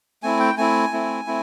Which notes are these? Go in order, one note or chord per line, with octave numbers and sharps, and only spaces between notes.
A3 C4 E4 G#5
G5
A3 C4 E4 G#5
A3 C4 E4
A3 C4 E4